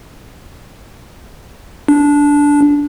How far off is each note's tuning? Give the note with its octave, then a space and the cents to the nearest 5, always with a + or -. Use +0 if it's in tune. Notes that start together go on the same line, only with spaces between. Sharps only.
D4 -15